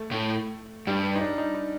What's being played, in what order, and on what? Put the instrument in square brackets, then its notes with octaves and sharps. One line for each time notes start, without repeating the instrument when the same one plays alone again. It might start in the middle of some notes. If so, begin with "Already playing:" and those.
Already playing: [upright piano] A3
[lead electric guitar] A2
[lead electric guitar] G2 [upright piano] G3
[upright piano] D#4
D4
D#4
D#4